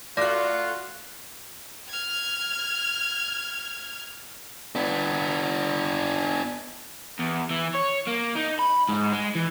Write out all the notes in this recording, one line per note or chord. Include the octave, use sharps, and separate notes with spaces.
A3 F4 F#4 D5 D6 F#6 A#6
F6 G#6
B3 D4
E2
E3
C#5
A#3
D#4
B5
G#2
G#3
E3